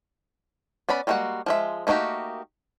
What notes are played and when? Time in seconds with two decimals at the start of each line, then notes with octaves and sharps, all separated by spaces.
0.89 B3 C#4 D5 B5
1.07 G3 G#3 A#3 F#4 F#5
1.46 F3 G#3 E5
1.87 A3 A#3 D#4 F#4 G4